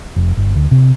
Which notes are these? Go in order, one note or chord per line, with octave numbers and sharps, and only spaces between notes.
F1
G1
D2
C3